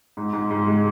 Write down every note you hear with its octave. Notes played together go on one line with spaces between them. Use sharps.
G#2
G#2
G#2
G#3